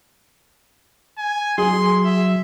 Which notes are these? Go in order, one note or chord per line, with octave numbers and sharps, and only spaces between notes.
G#5
F#3 G#4 C6
E5